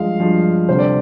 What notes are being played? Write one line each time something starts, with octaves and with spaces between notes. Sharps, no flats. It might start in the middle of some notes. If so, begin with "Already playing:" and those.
Already playing: G2 F3 G#3 F5
G2 F3 G#3
D2 C3 G3 C5
D5